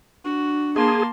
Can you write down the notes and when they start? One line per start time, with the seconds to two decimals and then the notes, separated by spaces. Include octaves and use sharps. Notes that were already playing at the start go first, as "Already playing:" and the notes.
0.25 D4 F#4
0.76 A#3 G#4 A5 C6